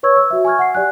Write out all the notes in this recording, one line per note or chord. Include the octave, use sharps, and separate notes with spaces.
B4 C#5 C#6 E6 G#6
E6
F#4 E5
G#5 C#6 F6 G#6
F#5 C7
G4 D5 G#5 F#6